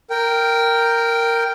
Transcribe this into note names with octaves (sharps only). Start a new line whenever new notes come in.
A#4 G5